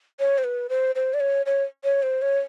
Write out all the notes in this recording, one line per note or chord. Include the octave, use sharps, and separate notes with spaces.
C#5
C5
B4
C5
C5
D5
C#5
C#5
C#5
C5
C#5